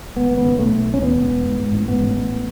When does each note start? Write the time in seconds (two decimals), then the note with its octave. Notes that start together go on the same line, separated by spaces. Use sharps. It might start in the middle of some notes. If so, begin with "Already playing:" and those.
0.16 G#1 B3
0.31 G#1
0.37 B3
0.44 C#3
0.59 B1 A3
0.73 B1
0.88 A2
0.94 C#4
1.02 D#2 B3
1.16 E1
1.30 E1
1.45 G#2
1.60 G#2
1.73 A1
1.88 G#2 B3
2.02 A1
2.16 A1